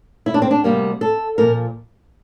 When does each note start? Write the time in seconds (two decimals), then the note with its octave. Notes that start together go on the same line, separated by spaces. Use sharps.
0.26 E4
0.34 D4
0.42 C4
0.51 D4
0.64 D2 C3 G3 A#3
1.01 A4
1.38 A#2 F3 A#4